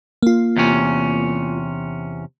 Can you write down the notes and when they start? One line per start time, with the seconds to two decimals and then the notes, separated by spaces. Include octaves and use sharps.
0.23 A#3 F4
0.57 E2 C3 C#4